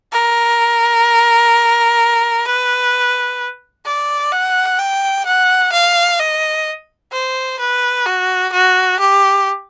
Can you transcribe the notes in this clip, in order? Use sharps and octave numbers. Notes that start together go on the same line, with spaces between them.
A#4
B4
D5
F#5
G5
F#5
F5
D#5
C5
B4
F#4
F#4
G4